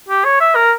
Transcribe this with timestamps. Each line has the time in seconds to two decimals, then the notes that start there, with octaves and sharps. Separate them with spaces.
0.09 G4
0.24 C#5
0.40 E5
0.55 A#4